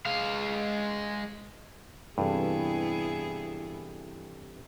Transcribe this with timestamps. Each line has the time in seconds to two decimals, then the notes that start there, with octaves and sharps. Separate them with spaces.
0.06 G#3 F5
2.18 G2 C3 E3 B3 E4 G#4 A4